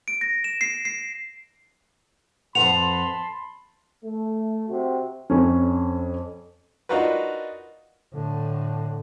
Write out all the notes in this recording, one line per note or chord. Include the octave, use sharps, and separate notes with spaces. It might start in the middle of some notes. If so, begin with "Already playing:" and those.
D7
A#6
E7
C7
C7
F2 B4 F#5 A5 B5 C6 F7
A3
C3 F#4
F2 C#4
D4 D#4 F4 F#4 A#4 B4
A2 D3